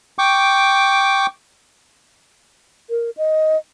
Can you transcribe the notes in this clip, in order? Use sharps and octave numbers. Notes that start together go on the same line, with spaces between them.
G5 C#6 D6
A#4
D#5